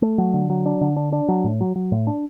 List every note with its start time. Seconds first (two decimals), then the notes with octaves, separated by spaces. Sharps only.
0.02 A3
0.18 F#3
0.34 D3
0.50 F#3
0.66 D4
0.81 D3
0.96 D4
1.12 D4
1.28 F#3
1.44 A2
1.61 F#3
1.76 F#3
1.92 A2
2.07 D4